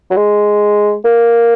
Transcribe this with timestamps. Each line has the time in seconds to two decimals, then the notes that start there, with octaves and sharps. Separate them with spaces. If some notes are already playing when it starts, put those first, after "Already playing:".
0.10 F#3
0.16 G#3
1.05 A#3